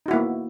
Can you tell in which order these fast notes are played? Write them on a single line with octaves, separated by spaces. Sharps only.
D#4 F#4 E4 A#3 B3